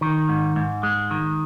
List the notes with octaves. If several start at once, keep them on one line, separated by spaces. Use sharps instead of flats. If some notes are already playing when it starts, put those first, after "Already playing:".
D#3
G#2
G#2
G#3
D#3